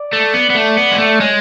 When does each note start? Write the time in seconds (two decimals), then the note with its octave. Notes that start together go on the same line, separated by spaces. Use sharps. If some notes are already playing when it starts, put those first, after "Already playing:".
Already playing: D5
0.13 A3
0.34 B3
0.50 B3
0.55 A3
0.77 B3
0.91 G#3
0.98 A3
1.20 G#3 C#5